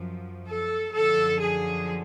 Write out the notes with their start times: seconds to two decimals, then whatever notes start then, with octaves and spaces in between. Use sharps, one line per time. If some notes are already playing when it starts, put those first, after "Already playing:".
Already playing: F#2 F3
0.48 A4
0.95 F#2 D3 F3 A4
1.42 G#4